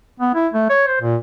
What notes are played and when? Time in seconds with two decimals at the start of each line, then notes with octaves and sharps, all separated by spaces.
0.20 B3
0.35 E4
0.54 A3
0.69 C#5
0.87 C5
1.01 A#2